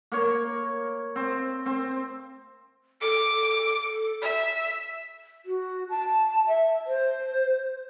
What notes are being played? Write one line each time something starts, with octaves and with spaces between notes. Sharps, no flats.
A#3 C#5
C4
C4
A4 D6
E5
F#4
A5
E5
C5